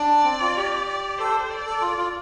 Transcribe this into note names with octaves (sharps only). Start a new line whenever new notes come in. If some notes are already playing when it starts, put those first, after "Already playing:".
Already playing: D4 D5
C4
F4
G4
D5
A4 C5
D5
A4
F4
F4